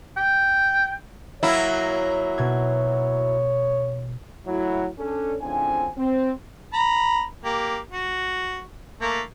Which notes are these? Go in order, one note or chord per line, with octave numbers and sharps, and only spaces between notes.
G5
F#3 A#3 E4 C#5
B2 G#6
F#3 A3 E4 F#4
C#4 D4 A4
A2 C#3 F3 C4 D4 G#5
C4
A#5 B5
A#3 G4
F#4
A3 A#3